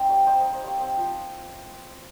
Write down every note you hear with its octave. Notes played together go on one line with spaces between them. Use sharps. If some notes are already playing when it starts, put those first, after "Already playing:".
Already playing: C4 D#4 G5 A#5
G3 C#5 F5
G3 C5 D#5
D#4 C5 D#5
C5 D#5
G3 C#5 F5
C4 C5 D#5 F5
F3